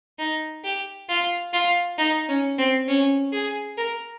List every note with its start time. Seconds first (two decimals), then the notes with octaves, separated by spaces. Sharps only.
0.19 D#4
0.64 G4
1.09 F4
1.53 F4
1.98 D#4
2.29 C#4
2.58 C4
2.88 C#4
3.33 G#4
3.77 A#4